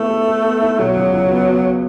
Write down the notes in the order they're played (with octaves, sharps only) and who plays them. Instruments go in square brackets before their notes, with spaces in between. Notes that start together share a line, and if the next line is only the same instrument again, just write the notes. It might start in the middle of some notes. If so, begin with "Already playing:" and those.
Already playing: [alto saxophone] A3 [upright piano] B3 E4 A4
[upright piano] A4
A4
B3
E4
[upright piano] B2 [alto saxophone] F#3
[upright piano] C#2
C#2
B3
B3